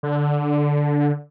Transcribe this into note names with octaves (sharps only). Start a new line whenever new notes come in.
D3